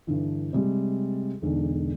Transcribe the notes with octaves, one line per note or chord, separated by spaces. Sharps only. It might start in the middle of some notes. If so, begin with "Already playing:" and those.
G2 D3 E3
C3 G3 G#3
E1 B1 D3